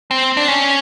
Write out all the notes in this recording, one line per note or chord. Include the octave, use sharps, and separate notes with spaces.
C4
D4
C#4